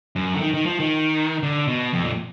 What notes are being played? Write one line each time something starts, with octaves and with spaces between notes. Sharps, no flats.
F#2
D3
D#3
D#3
F3
D#3
D3
B2
F2
A#2